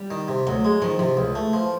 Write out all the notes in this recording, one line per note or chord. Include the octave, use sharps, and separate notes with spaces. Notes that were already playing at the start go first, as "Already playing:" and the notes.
Already playing: G3
D#3
C3
D2 F#3
G#3
D#3 F3
C3 F3
C#2 E3
A3
F3